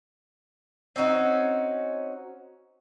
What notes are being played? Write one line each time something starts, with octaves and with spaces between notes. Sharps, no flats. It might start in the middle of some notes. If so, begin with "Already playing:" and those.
C4 C#4 D#4 F#4